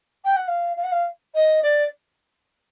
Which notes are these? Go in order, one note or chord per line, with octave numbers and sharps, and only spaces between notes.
G5
F#5
F5
F5
F#5
F5
D#5
D5